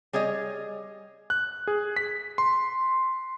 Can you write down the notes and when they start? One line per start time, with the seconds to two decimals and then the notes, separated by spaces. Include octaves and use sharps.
0.13 G3 G#4 C#5 D#5
1.30 F#6
1.67 G#4
1.96 B6
2.38 C6